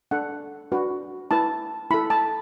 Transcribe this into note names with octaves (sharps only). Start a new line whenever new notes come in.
D4 A4 F#5
D4 F#4 B4
E4 B4 A5
E4 A4 B5
A5